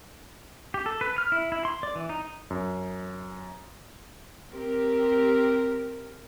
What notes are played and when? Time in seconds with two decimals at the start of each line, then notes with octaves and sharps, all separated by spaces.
0.74 G4
0.86 A4
1.01 B4
1.18 F6
1.32 E4
1.52 E4
1.65 C6
1.83 D5
1.95 E3
2.09 D#4
2.50 F#2
4.52 C4 G4 A#4